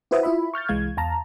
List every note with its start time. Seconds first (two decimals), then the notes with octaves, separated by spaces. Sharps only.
0.11 E4 F#4 B4 C5 E5 D#6
0.23 E4 F4 E5 B5
0.54 C#6 F6 G6 A6
0.69 C2 E3 G#3 F5 G#6
0.97 E2 F5 A5 A#5